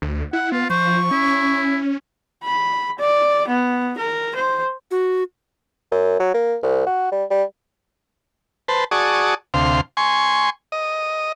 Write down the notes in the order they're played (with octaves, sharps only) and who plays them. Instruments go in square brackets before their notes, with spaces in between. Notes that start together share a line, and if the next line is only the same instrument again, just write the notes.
[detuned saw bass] D2
[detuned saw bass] E4 [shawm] F#5
[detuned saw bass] B3 [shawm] F4
[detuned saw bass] F3 [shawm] C5 [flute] C#6
[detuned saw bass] C#4 [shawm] E4
[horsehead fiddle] B5
D5
B3
A#4
C5
[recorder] F#4
[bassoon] F#2
F#3
A#3
C2
F#4
G3
G3
[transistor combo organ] B4 C5 A5
F#4 G#4 D5 A5 C#6 D#6
D2 C3 F5 C6
G#5 C6 C#6
D#5